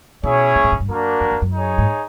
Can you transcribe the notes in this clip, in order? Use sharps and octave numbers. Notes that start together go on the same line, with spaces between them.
B2 C#4 E4 G#4 C#5
B2
A2
G#2
G2
F#2 A#3 D4 F#4 A#4
F2
F2
F#2
D#4 G#4 C#5
G#2